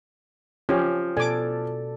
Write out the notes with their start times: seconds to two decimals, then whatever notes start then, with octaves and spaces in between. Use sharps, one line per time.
0.69 F3 C#4 G4
1.17 B2 A4 D5 G#5 D6